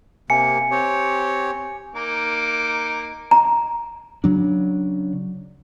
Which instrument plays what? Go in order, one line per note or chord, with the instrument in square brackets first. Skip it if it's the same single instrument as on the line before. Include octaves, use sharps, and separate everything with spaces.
[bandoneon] C3 A#3 [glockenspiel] G#5 C#7
[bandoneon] C4 G4 C#5
[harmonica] A#3 D#4 D6
[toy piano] A#5
[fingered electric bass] C#3 F#3 D4